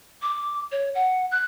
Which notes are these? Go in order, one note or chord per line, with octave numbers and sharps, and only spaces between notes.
D6
C#5
F#5
F#6